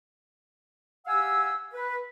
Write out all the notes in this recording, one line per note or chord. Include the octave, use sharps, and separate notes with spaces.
G4 F5 F#5 G#5 E6
B4